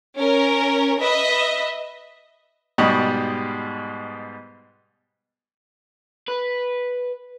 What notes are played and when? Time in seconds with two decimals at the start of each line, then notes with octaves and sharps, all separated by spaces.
0.16 C#4 A#4
1.01 B4 D#5 E5
2.78 G#2 B2 G3 G4 D#5 C#6
6.28 B4